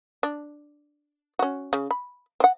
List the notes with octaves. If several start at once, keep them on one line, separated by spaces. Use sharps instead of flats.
D4
C#4 F#4
C#3
B5
C4 F#5